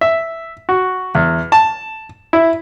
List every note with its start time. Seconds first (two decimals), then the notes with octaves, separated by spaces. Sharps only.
0.01 E5
0.69 F#4
1.15 E2
1.52 A5
2.33 E4